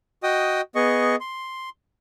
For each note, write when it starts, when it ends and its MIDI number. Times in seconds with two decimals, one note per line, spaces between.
0.23 0.61 66
0.23 0.61 75
0.23 0.61 79
0.23 0.61 87
0.75 1.16 59
0.75 1.16 68
0.75 1.16 75
0.75 1.16 85
1.21 1.69 84